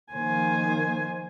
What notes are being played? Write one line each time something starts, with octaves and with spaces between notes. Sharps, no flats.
D#3 F3 A#3 C5 G#5